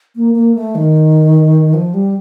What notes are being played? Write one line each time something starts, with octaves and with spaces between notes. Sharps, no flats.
A#3
A#3
A3
D#3
F3
G3